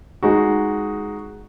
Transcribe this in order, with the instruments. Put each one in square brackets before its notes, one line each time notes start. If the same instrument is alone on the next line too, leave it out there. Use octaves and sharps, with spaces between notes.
[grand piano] G#3 D#4 F#4